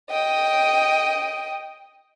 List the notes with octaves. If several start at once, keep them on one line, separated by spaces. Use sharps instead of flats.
D#5 G5